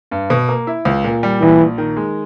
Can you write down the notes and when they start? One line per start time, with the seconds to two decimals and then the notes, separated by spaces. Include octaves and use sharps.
0.11 G2
0.30 B2
0.48 A#3
0.67 E4
0.85 C#2
1.04 A#2
1.23 G3
1.41 A#1 E3
1.60 A#1
1.78 D#3
1.97 G#3